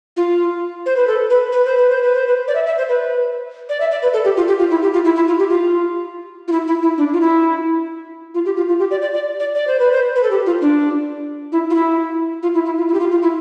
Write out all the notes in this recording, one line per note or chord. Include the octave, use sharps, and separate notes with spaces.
F4
C5
B4
A4
B4
B4
C5
B4
C5
B4
C5
B4
D5
E5
E5
C5
B4
D5
E5
D5
B4
A4
G4
F4
G4
F4
E4
G4
F4
E4
E4
F4
G4
F4
F4
E4
E4
E4
D4
F4
E4
F4
G4
F4
F4
G4
D5
D5
D5
D5
D5
C5
B4
C5
B4
A4
G4
F4
D4
E4
F4
E4
F4
E4
E4
F4
E4
G4
F4
F4
E4